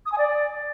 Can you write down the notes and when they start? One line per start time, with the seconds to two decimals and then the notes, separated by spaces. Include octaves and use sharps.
0.06 D#6
0.12 G#5
0.18 D5